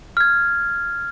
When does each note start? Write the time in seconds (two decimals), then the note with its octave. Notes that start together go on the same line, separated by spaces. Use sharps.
0.17 F6 G#6